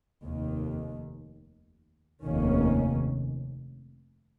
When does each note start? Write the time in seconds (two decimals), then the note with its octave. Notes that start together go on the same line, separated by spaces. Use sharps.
0.25 F1 D#2 D#3
2.23 F1 D#2 D#3 A#3 C#4